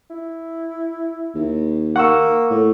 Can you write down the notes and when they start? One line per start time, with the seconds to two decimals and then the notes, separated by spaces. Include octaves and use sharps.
0.10 E4
1.35 D#2
1.96 A#3 F#5 C#6 E6
2.50 A2